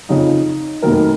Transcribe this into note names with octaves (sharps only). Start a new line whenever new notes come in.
F2 C#3 F3 D#4
F1 D#2 D#3 F#3 A#4